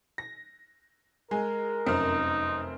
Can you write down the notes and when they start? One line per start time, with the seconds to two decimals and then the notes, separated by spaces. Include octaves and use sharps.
0.18 A#6
1.31 G#3 A#4 G#5
1.86 F1 F#2 C4 D#4 F6